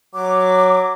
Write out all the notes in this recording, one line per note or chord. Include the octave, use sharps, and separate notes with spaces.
F#3 D6